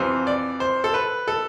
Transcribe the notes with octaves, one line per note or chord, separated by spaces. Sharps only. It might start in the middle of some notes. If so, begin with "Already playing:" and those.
Already playing: F2 C3 E3 C5
D5
C5
A4
B4
A4